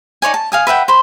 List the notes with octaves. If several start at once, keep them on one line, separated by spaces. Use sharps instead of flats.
D#4 C#5 D5 G#5
A5
F5 G#5 D#6
B4 E5 F#5 G5
C5 B5